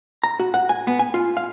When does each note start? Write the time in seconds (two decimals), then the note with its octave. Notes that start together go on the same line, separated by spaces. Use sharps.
0.24 A#5
0.40 F#4
0.54 F#5
0.69 G#5
0.87 B3
0.99 G#5
1.14 F4
1.37 F5